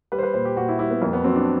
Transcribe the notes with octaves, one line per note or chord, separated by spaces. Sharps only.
G3 B4
C5
B4
A#2 C5
G4
A#2 F#4
E4
G3 E4
B3
F2 A#3
B3
F#3 C4
D4